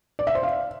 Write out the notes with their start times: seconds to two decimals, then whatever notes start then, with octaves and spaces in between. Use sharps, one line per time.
0.19 D5
0.27 E5
0.35 C5
0.43 F5